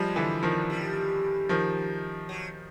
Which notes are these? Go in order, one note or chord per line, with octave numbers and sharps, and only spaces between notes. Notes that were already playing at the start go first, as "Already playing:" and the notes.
Already playing: F3 G3 G#3
D3 E3
D#3 F3
G3
D#3 F3
F#3